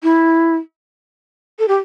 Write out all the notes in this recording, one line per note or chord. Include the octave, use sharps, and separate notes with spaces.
E4
A4
G4